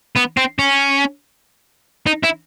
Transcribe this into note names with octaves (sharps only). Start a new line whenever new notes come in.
B3
C4
C#4
D#4
E4